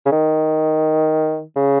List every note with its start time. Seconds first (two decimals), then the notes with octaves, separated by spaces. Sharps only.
0.06 C#3
0.12 D#3
1.56 C#3